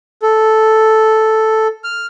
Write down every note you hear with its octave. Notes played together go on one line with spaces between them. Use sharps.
A4
F6